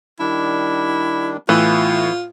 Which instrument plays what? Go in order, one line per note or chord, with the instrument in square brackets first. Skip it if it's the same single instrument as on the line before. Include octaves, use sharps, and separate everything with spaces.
[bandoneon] D#3 G3 D4 [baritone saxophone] E4
[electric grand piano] A2 [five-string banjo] E3 [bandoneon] B3 E4 [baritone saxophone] F4